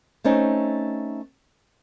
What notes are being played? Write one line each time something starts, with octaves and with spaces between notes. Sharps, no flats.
A3 C4 C#4 D#4